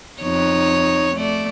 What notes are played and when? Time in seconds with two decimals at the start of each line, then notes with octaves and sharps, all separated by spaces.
0.21 F2 D#4 C#5
1.16 A3 D5